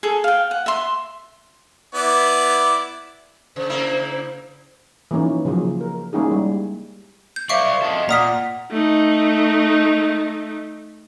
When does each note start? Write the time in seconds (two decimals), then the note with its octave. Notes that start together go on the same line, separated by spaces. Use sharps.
0.03 G#4 A4
0.24 F5 G5
0.51 F#5
0.66 E5 C6
1.94 B3 E4 D5
3.56 C#3 C5
3.69 C#3 A#3 E4
5.11 E3 F3 A#3 C#4 D#4
5.45 C#3 F3 F#3 A#3 G#4
5.81 A#4
6.13 G#3 A#3 C#4 D#4 E4 G#4
6.32 G3
7.36 G6
7.49 C5 D5 E5 F5 C#6
7.83 A4 D#5
8.09 A#2 D5 F#5 A#5 D#6 F6 B6
8.71 A3 D#4